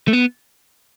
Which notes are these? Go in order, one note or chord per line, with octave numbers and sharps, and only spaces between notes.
A3
B3